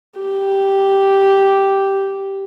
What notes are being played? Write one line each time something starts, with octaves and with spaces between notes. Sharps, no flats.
G4